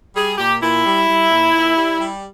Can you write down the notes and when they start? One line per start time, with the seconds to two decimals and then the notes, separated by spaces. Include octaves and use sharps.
0.15 G3 G#4
0.38 A#2 G4
0.61 A#2 E4
0.85 G3
1.08 G3
1.31 A#2
1.53 A#2
1.76 G3
2.00 G3